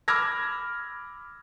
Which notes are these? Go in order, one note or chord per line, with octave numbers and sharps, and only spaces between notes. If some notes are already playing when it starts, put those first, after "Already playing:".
B5 D6 E6 F6 G#6 A#6